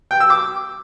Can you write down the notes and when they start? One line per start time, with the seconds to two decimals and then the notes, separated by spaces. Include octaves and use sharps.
0.11 G5
0.20 E6
0.30 D6